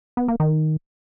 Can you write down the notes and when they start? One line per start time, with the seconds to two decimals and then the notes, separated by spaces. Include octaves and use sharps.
0.17 B3
0.28 A#3
0.40 D#3